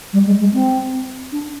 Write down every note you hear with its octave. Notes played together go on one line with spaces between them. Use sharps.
G3
G#3
G#3
C4
D4